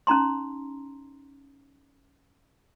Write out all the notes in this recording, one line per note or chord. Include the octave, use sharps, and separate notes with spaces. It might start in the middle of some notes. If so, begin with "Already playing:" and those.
C#4 D#4 A#5 C6